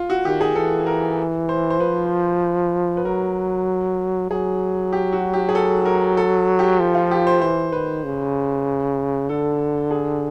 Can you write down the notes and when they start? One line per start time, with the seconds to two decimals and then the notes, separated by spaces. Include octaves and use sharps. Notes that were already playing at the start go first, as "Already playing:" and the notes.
Already playing: F4
0.10 F#4
0.25 D#3 G4
0.41 G#4
0.55 E3 A4
0.86 A#4
1.49 C5
1.70 C5
1.80 F3 B4
2.97 B4
3.05 F#3 A#4
4.30 F#3 G#4
4.93 G4
5.13 F#4
5.34 G4
5.49 G#4
5.55 A4
5.85 A#4
6.17 A4
6.59 G4
6.80 F3
6.95 F4
7.11 G4
7.27 C5
7.41 E3 C5
7.72 D#3 B4
8.04 C#3
9.29 D3 A4
9.91 G#4